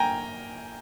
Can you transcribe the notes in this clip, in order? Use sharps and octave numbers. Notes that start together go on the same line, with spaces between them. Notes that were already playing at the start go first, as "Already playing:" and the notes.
Already playing: A#3 G5 G#5 A#5